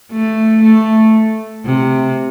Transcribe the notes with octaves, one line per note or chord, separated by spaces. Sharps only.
A3
A3
C3